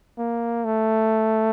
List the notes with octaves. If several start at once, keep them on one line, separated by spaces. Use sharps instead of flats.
A#3
A3